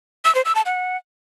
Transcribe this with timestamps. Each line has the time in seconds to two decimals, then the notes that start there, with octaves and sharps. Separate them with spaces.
0.25 E6
0.35 C5
0.45 E6
0.55 A5
0.66 F#5